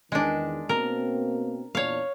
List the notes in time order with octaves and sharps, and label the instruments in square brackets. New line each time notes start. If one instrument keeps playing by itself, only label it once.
[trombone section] E2 D#3 [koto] G#3 D4
[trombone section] B2 A#3 C4 [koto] A#4
[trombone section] E2 A#2 D4 [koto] C#5 F5